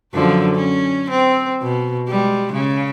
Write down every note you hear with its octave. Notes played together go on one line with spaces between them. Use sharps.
F#2 D3 F3
C#4
C4
B2
G3 G#3
C#3